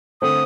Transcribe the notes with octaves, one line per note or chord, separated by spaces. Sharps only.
D3 A3 C4 D#6